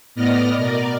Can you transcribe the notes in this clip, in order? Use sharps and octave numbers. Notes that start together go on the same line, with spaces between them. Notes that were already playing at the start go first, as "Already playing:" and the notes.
A2 B3 D5 D#5 F6 A#6
B2 A#4 D5